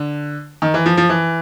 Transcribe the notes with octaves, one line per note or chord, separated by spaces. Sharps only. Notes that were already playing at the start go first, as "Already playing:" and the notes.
Already playing: D3
D#3
E3
F3
F3
E3